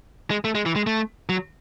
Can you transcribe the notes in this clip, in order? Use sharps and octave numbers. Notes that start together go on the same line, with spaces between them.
G#3
A3
G#3
E3
G#3
A3
F#3